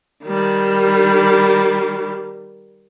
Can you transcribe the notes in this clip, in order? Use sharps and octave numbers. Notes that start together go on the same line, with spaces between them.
D#3 G3